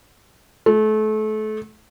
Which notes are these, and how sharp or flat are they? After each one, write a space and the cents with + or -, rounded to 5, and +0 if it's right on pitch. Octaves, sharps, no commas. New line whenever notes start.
A3 -30